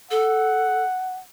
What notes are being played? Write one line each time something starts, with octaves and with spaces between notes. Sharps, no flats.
A4 F#5